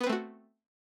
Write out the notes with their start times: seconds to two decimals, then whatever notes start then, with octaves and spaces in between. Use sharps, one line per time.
0.01 B3
0.04 B4
0.06 C4
0.09 A3
0.12 F#4